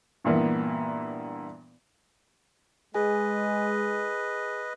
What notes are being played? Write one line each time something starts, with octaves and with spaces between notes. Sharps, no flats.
G2 A#2 E3 A#3 B3
G#3 G#4 B4 D#5 G#5